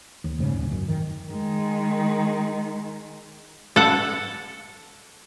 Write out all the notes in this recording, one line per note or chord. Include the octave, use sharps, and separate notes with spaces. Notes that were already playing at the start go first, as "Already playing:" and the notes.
D#2
F1 G#2 C#3
D1
F#2
D#3
D#3 G#3
A4 F#5